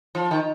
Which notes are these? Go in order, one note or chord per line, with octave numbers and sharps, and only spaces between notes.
F3
D#3